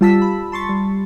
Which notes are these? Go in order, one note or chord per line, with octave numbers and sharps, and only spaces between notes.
G3 F4 A5 E6 B6
B5
A5 C6 C#6 A6
G3